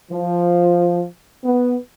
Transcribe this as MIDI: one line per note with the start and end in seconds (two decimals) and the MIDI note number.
0.11 1.04 53
1.43 1.75 59